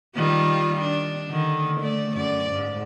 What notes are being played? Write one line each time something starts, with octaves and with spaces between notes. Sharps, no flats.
D#3 G3 F4
D4
D3 D#3
A3 D5
F#2 D5
G#2